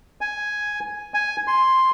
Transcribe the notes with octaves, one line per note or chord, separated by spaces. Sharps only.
G#5
G#5
C6